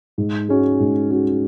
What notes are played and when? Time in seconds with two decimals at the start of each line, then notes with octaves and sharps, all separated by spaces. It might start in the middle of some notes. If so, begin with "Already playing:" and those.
0.18 G#2
0.49 G#3 C#4 F#4
0.80 G#2
1.11 G#3 C#4 F#4